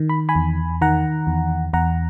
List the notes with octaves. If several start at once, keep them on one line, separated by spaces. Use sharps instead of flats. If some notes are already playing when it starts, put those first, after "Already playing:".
Already playing: D#3
B5
G#5 B5
E2
D#3 F#5 A#5
E2
E2 F#5 A#5